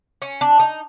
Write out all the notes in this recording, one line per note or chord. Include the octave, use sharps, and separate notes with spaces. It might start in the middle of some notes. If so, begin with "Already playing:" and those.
C#4
D4
D#4